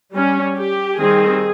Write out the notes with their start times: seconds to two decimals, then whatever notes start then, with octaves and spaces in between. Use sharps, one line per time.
0.12 G3 C#4
0.55 G4
0.99 D#3 G3 C4 D#4 G#4